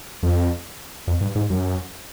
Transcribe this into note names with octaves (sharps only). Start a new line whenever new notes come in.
F2
F2
G2
G#2
F#2